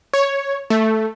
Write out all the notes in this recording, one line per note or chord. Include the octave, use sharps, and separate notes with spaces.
C#5
A3